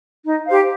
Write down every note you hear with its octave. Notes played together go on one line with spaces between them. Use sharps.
D#4
G4 C5 F5